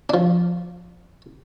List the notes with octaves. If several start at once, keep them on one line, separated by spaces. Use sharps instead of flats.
F3 D4